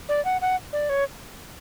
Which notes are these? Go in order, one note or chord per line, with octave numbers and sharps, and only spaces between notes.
D5
F#5
F#5
D5
C#5